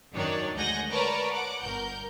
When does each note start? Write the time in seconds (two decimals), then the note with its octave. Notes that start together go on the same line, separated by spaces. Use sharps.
0.13 F#2 D#3 D4 D#4 C#5 D5
0.55 D2 G#3 F#5 G#5 G6 A#6
0.91 A#4 B4 C#5 D5 A5 A#5
1.31 F#5 D6
1.62 G1 A#4 G6